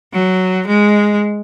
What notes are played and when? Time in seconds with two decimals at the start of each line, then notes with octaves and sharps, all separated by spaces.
0.13 F#3
0.67 G#3